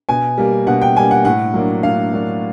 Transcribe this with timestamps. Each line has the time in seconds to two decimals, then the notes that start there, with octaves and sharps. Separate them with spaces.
0.09 B2 G#5
0.38 G3 A#3
0.67 B2 F#5
0.82 G5
0.96 G3 A#3 G#5
1.11 F#5
1.25 A2 F#5
1.54 F#3 A#3 D4
1.83 A2 F5
2.13 F#3 A#3 D4